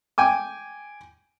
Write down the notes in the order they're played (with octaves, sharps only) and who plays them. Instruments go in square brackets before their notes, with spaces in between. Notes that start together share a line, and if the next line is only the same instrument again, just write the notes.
[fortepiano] G5 G#5 D6